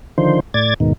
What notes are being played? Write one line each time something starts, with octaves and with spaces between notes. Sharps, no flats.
D3 D#3 F3 C5
A2 D5 G#6 A6
D#2 G#2 B2 D#3